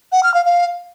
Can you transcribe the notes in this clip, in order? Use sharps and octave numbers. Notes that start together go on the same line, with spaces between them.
F#5
F6
F5
F5